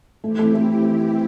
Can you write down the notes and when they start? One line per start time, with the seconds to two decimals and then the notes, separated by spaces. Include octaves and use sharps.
0.23 E3 A3 C4 E4 G4
0.39 A3
0.55 A3